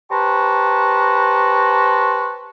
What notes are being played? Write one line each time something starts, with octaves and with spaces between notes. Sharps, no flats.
G4 B4 C5 A5 A#5 C#6